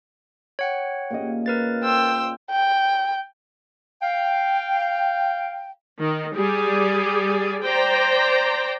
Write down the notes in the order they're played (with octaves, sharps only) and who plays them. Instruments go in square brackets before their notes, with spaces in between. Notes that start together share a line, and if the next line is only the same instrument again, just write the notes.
[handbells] C#5 F#5 G5
[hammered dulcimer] A#2 C#3 D#5
[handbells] A#4 B4 A6
[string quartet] C5 G5 E6
[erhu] G5
[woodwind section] F5 G5
[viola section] D#3
G3 G4 G#4 D5
C5 D5 G5 A#5